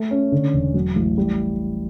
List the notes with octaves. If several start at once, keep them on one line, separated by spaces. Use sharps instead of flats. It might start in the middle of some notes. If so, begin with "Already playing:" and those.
Already playing: A3
C#4
D3
E1
F#3
A1
G3